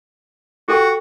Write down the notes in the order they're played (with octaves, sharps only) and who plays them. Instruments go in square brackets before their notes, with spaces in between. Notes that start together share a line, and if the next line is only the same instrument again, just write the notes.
[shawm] F#4 [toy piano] G4 A4 G5